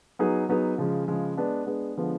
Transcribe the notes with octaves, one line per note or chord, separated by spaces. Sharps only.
F#3 B3 D#4 G#4
F#3 B3 D#4 G#4
C#3 F3 G#3
C#3 F3 G#3
G#3 B3 D4
G#3 B3 D4
D3 F3 G#3 B3